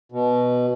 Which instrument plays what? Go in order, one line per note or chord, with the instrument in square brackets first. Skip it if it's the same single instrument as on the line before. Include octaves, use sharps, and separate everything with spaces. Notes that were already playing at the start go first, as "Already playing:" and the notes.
[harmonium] B2